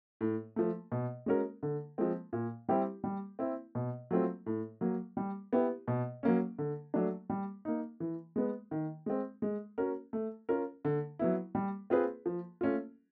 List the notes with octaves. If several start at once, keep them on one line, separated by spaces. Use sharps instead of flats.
A2
F3 A3
B2
G#3 C#4 F#4 A#4
D3
F3 G#3 C4
A#2
G3 C4 E4 G4
G3
C4 E4
B2
F#3 A3 C4 F4
A2
F#3 A#3
G3
B3 E4 G4
B2
F#3 A#3 C#4
D3
F#3 A3 D4
G3
A#3 D#4
E3
G#3 B3
D#3
G#3 C4
G#3
C#4 F#4 A#4
A3
C#4 F4 A#4
D3
F#3 B3 E4
G3
C4 F4 G#4 B4
F3
A3 C#4 F4